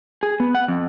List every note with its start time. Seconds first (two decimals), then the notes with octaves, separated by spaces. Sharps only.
0.23 G#4
0.40 B3
0.55 F#5
0.68 F2